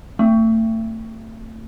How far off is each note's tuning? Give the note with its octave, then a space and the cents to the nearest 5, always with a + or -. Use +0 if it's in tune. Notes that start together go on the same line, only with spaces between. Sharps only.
A3 +30 C4 +0